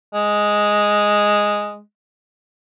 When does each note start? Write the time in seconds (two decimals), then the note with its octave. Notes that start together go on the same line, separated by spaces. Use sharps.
0.14 G#3